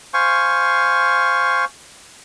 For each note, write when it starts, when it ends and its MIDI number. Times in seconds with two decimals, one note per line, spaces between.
0.14 1.65 72
0.14 1.65 77
0.14 1.65 80
0.14 1.65 85